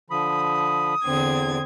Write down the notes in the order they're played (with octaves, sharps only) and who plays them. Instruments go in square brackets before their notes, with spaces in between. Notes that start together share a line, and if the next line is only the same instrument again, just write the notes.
[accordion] D3 F3 B5 [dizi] D#6
[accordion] E2 [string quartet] D3 C4 G#6